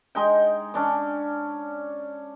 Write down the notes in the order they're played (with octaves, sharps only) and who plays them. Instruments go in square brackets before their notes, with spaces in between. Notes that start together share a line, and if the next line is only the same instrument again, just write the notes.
[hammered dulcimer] G#3 D#4 G5
C#4 D4 D6